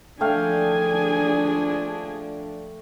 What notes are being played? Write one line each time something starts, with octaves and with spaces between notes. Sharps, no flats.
F3 A3 D4 G#4 F5 G5 G#5